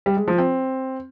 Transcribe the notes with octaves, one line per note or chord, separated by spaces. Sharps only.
G3
G#3
F3
C4